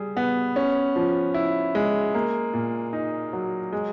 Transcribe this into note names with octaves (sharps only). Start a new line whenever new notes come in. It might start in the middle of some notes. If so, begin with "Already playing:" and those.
Already playing: G3 G#4
B3
C#4
F3
E4
G#3
A#3
A#2
D#4
F#3
G#3